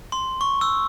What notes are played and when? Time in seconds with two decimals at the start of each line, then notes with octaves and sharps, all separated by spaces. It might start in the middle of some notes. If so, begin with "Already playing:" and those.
0.12 C6
0.41 C#6
0.61 E6